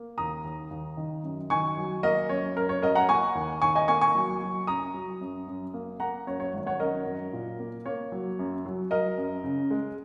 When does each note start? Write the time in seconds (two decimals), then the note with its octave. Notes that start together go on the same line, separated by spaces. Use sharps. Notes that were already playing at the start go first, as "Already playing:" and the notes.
Already playing: A#3
0.18 D#2 A#5 D#6
0.44 D#2
0.71 D#2
0.97 D#3
1.24 F#2
1.50 D#3 G#5 C#6
1.77 F#3
2.03 A#3 A#4 D#5
2.29 F#2 C#5
2.56 F#2 A#4
2.69 C#5
2.82 F#2 A#4 D#5
2.95 F#5 A#5
3.09 A#3 G#5 C#6
3.35 D#2
3.62 D#2 G#5 C#6
3.75 D#5 G#5
3.88 A#3 G#5 C#6
4.01 G#5 C#6
4.15 F#3
4.41 F#3
4.67 F#2 A#5 D#6
4.94 F#3
5.21 F#2
5.47 F#2
5.74 A#3
6.00 A#3 F#5 A#5
6.27 F#2 C#5
6.40 C#5
6.54 G#1
6.67 C#5 F#5
6.80 F#2 A#4 D#5
7.06 F#2
7.33 A#2
7.59 A#3
7.86 A#3 C#5
8.12 F#3
8.39 F#2
8.66 F#3
8.91 F#3 A#4 D#5
9.17 F#2
9.44 C#3
9.71 G#3